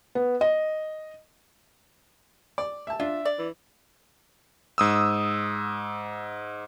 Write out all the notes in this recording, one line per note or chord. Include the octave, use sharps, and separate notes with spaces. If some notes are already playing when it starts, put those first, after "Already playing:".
B3
D#5
D5
E5 A5
D4 F4 E5
D5
E3
G#2 D#6 E6